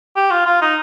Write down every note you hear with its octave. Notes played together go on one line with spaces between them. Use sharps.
G4
F4
F4
D#4